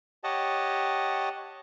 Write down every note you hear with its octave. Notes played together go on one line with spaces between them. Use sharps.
G4 C#5 D#5 F#5 A5